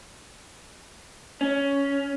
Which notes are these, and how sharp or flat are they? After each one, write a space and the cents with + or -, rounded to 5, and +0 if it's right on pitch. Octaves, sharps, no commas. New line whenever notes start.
C#4 +10